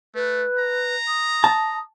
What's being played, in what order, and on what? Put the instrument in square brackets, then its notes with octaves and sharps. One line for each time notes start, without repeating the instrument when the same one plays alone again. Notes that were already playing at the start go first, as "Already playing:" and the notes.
[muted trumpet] A3 [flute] B4
[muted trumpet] A#5
[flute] D#6
[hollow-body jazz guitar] A5